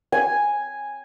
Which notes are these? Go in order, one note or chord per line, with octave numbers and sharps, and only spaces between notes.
G#5